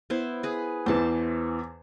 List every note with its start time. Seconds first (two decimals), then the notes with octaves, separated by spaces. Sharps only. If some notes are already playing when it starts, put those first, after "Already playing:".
0.10 B3 E4 C5
0.43 G#4 B4
0.86 E2 E3 C5 A5